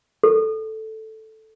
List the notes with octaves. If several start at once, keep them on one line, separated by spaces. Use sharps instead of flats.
A4